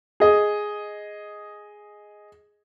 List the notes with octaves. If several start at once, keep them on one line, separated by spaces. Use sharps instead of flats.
G#4 D#5